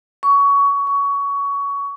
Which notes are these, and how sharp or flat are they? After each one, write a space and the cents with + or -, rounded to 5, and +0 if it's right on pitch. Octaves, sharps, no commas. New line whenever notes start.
C#6 +20
C#6 +20